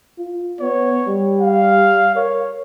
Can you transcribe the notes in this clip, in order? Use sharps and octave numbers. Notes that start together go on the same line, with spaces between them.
F4
B3 C#5
G3
F5
A#4 C#5